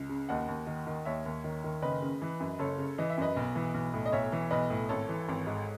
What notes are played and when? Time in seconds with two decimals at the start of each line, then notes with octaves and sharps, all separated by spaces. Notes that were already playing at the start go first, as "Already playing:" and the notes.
Already playing: C#2
0.09 C#3
0.29 D#2 D#5 F#5
0.48 D#2
0.67 D#3
0.87 D#3
1.05 D#2 C#5 E5
1.26 D#2
1.44 D#3
1.64 D#3
1.82 F#1 B4 D#5
2.02 C#3
2.22 E3
2.40 F#2
2.59 F#1 A4 C#5
2.78 C#3
2.98 E3 D#5
3.10 E5
3.17 F#2 B4 D#5
3.36 B1
3.55 E3
3.74 B1
3.94 A2
4.06 D#5
4.12 B1 C#5 E5
4.32 E3
4.51 B1 B4 D#5
4.70 A2
4.89 G#1 A4 C#5
5.09 E3
5.29 G#1
5.47 G#2